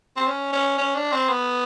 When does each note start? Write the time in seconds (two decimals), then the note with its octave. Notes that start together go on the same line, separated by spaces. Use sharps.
0.16 C4
0.27 C#4
0.52 C#4
0.78 C#4
0.95 D4
1.12 C4
1.29 B3